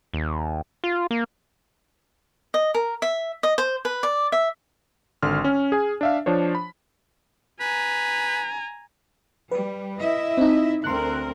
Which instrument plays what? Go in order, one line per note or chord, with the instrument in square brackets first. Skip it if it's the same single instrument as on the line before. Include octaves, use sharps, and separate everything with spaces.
[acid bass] D#2
F4
A#3
[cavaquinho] D#5
A#4
E5
D#5
C5
B4
D5
E5
[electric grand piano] G#1 D3 C6 F6
C#4
G#4 G#5
D4 E5 F5
F3 D4 C5 C#5
B5
[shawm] B4 [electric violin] G#5 A#5
[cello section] G3 [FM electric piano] B4
[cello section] E4 D#5 E5
[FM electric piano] C4 D#4
[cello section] D2 C4 A#4 [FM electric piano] C6 F#6